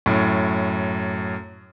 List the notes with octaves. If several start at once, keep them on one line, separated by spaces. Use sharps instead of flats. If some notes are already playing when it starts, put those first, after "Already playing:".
F#2 A2